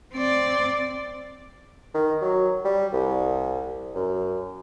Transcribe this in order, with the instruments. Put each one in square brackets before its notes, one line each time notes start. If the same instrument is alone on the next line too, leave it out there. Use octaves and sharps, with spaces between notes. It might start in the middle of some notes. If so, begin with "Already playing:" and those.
[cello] C4 D5
[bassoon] D#3
F#3
G3
C2
F#2